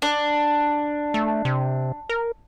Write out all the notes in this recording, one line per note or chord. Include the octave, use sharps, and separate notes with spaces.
D4
A3
C3
A#4